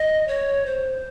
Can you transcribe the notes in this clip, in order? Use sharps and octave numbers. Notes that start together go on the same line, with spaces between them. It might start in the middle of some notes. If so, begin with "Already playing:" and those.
Already playing: D#5
C#5
C5